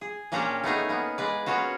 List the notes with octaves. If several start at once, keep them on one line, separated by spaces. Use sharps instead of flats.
G#4
A#2 A#3 C#4 D4 G4 A#5
A3 B3 D#4 G#4
A#3 B3
G#3 B4 D5
A#3 B3 C#4 F4 F#4